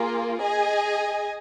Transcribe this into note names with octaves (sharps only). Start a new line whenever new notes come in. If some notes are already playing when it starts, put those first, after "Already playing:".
Already playing: A#3 F4 G#4
G#4 D#5 G#5